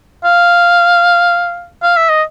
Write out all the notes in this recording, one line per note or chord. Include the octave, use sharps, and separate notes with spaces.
F5
F5
E5
D#5